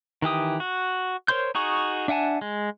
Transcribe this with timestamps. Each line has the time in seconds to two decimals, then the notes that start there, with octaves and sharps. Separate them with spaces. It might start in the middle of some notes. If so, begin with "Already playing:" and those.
0.22 D#3 E3 G4 D#6
0.60 F#4
1.28 A#4 C5 C#5 C6 G6
1.55 D#4 F#4 G#4 C#6
2.08 D4 E5 F#5 G#5 A5
2.41 G#3